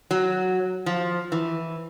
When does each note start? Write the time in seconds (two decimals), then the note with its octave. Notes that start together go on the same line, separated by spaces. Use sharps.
0.11 F#3
0.86 F3
1.32 E3